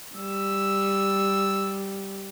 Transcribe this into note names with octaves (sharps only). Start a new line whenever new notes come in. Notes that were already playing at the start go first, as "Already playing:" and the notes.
G3 E6